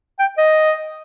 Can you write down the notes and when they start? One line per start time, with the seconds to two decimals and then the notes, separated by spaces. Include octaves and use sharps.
0.19 G5
0.38 D#5